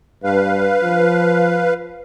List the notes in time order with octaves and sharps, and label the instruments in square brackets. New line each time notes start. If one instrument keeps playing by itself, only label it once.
[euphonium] G2 [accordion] B4 F5
[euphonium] F3